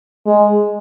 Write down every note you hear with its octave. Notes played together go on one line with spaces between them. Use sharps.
G#3